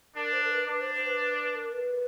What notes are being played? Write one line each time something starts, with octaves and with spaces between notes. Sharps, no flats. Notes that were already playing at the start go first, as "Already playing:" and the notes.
D4 A#4
C5
A#4
B4
D4 B4
C5
C5
B4
B4
B4
A#4
B4